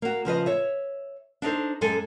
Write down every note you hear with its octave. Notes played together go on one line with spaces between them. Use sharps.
A#3 F#4
C#3 F3 B4 D#5
C#5 E5
D4 D#4 A4 C5
F#2 G#3 G#4 A4 G#5